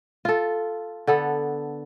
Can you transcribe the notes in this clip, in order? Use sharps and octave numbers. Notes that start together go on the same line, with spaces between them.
F4 A4
D3 B3 A4